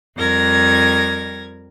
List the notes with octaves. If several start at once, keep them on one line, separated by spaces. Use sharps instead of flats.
F2 G3 A#4 G#6 A#6